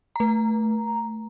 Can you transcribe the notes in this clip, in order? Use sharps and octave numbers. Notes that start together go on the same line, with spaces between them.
A3 A#5